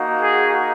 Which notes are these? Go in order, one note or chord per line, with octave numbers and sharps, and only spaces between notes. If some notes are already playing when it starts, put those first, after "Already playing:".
Already playing: A#3 D#4 F#4
G#4